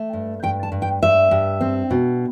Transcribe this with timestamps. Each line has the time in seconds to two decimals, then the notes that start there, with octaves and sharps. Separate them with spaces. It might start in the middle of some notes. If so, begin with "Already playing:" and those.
Already playing: A3
0.13 G2
0.43 G2 G5
0.63 A5
0.72 G2
0.82 G5
1.02 G2 E5
1.31 G2
1.61 C4
1.91 B2